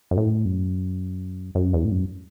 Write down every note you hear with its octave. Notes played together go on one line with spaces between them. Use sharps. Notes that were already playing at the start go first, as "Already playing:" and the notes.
F#2
A2
F#2
F#2
E2
A2
F#2